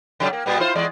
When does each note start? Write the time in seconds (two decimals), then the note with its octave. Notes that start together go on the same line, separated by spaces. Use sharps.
0.20 C#3 F#3 G3
0.33 A#3
0.46 A#2 G3 B3
0.60 E4 F4 C5
0.75 E2 G#3 D5